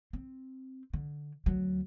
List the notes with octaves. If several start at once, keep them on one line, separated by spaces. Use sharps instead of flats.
C4
D3
D2 F#3